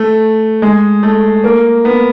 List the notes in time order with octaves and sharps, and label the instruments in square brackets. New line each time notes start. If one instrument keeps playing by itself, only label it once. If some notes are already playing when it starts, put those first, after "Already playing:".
Already playing: [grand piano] A3
G#3
A3
A#3
B3